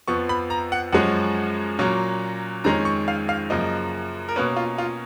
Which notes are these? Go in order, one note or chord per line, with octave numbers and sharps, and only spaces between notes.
F2 F3 B3 C#6
B5
A#5
F#5
F#2 F3 G#3 C#4 F#5
A#2 F#3 A#3 C#4
F2 D#3 G#3 C#4 A#5
C#6
F5
F5
F#2 C#3 F3 A#3 D#5
A#4
B2 A#3 C#4 B4
F4
F4